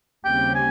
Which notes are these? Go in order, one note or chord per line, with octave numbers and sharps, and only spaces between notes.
D#2 C#3 G3 C4 G4 G5
G#5